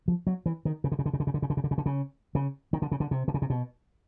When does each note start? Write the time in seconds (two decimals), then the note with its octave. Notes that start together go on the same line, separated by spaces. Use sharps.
0.08 F3
0.27 F#3
0.46 E3
0.65 D#3
0.84 C#3
0.92 D3
0.99 C#3
1.06 D3
1.13 C#3
1.20 D3
1.27 C#3
1.34 D3
1.42 C#3
1.50 D3
1.57 C#3
1.64 D3
1.71 C#3
1.78 D3
1.86 C#3
2.35 C#3
2.73 D#3
2.82 D3
2.92 C#3
3.00 D3
3.11 C3
3.28 D3
3.34 C#3
3.42 C3
3.50 B2